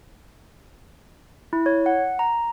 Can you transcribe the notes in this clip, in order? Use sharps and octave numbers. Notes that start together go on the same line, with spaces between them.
E4
C#5
F#5
A#5